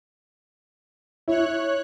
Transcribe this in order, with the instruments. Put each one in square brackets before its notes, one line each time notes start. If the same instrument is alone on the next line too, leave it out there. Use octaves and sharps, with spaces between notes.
[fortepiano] E4 [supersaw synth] C#5 F#6